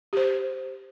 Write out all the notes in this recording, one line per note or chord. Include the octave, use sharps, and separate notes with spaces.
G4 C5